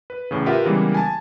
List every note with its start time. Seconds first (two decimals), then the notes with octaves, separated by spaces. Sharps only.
0.10 B4
0.31 E2 A2 C#3
0.46 F4 G4 A#4 B4 E5 F#5
0.65 C#3 E3 G3 G#3 A#3 B3
0.94 G#5 A5